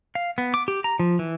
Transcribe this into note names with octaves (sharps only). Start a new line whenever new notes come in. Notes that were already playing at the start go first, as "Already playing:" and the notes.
F5
B3
D6
G4
A#5
F3
E3